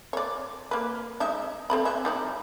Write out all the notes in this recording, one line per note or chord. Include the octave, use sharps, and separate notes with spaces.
C#5 D5
A#3 B4
G#3 D#4 E5
C4 A4 B5
E3 E5
G3 D#4 E4